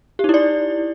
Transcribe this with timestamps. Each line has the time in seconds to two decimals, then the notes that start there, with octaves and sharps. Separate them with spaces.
0.19 G4
0.24 D#4
0.29 E4
0.34 D5